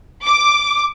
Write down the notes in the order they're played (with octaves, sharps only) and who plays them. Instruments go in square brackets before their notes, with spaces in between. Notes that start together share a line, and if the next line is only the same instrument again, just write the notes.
[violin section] D6